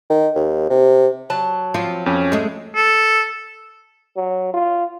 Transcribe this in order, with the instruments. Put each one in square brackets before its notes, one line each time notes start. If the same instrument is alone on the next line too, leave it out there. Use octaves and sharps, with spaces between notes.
[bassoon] D#3
D#2
C3
[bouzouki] F#3 A5
[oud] F3 C4 F4
[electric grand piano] F2 C#4
[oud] G#3 A3
[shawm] A4
[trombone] F#3
F4